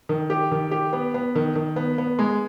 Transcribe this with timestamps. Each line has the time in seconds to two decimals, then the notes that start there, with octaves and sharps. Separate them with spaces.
0.09 D#3
0.30 G4
0.52 D#3
0.71 G4
0.93 B3
1.14 B3
1.35 D#3
1.56 D#3
1.76 B3
1.98 B3
2.19 G#3